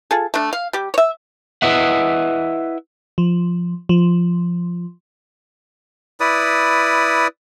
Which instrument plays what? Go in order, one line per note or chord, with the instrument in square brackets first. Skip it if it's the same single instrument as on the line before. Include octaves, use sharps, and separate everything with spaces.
[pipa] F4 G#4 A4
A3 D4
F5
G3 G4
C#5 E5
[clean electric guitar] E4 B4 D#5 E5 F#5
[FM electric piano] F3
F3
[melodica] E4 B4 D5 D#6